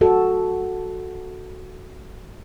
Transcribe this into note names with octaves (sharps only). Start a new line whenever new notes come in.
F#4 A4